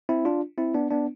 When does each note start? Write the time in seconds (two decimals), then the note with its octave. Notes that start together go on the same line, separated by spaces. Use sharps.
0.09 C4 E4
0.25 D4 F4
0.58 C4 E4
0.75 B3 D4
0.91 B3 D4